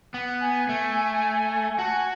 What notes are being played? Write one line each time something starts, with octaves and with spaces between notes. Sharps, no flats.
B3
G#5
A3
G#5
F#4 A5
G#5